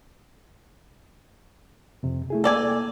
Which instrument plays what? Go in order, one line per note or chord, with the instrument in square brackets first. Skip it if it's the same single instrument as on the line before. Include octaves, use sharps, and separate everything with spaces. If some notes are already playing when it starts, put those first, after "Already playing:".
[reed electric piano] F2 C3
A3 E4 G#4
[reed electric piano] A#3 [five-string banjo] A4 D5 G#5